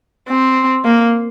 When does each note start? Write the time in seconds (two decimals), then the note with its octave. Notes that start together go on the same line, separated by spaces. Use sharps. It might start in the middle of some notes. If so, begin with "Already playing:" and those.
0.29 C4
0.85 A#3